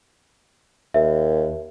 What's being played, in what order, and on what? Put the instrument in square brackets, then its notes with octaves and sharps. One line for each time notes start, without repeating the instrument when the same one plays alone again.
[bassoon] D#2 [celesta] E5